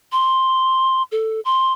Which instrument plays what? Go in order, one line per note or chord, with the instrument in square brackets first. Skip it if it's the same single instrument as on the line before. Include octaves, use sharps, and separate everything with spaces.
[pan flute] C6
A4
C6